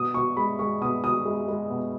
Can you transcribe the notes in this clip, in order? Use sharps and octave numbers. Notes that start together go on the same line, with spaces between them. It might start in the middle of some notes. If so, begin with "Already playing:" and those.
Already playing: B2 D#6
B2 C#6
G#3 B5
G#3 C#6
B2 D#6
B2 D#6
G#3
G#3
B2